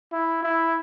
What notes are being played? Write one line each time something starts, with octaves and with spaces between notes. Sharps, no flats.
E4
E4